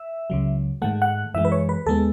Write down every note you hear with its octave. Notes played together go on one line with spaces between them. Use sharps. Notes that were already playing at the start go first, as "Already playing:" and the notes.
Already playing: E5
C#2 C#3 F#3
G#2 D#3 A3 F#5
F#5
F#2 E3 G#3 E5
B4
C#5
B4
D#2 D#3 G#3 B3 A4